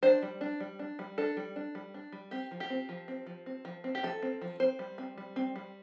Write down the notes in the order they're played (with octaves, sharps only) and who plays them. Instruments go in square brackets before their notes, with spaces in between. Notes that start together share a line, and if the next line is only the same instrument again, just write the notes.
[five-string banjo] D4 C5
G3
D4
G3
D4
G3
D4 A4
G3
D4
G3
D4
G3
C4 G4
F3
G4
C4
F3
C4
F3
C4
F3
C4
G4
F3 A4
C4
F3
C4 C5
G3
C4
G3
C4
G3